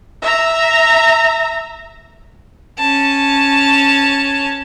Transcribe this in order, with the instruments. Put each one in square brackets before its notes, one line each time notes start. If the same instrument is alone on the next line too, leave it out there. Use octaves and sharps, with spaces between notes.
[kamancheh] E5 A#5
[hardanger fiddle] C#4 A5